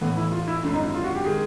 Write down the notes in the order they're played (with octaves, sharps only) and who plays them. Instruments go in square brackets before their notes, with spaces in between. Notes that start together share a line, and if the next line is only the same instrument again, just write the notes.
[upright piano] A1 A2 E3 A3 [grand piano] B3
[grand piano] E4
F4
E4
[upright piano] G#1 F#2 D3 [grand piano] E4
[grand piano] D#4
E4
F4
F#4
G4
[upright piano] D#3 G#3 [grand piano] G#4